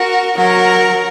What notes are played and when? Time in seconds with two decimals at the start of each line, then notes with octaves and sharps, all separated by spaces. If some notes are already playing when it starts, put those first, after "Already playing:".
Already playing: F#4 A#4
0.36 F#3 F#4 A#4